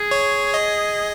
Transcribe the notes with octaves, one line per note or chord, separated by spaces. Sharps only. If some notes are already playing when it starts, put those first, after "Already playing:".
Already playing: G#4
C#5
D#5